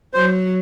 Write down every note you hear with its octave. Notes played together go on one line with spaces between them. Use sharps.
F#3 C5